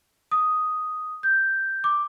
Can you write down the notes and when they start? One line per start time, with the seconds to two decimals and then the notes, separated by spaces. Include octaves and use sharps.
0.31 D#6
1.23 G6
1.84 D6